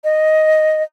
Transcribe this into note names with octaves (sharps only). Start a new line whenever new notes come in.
D#5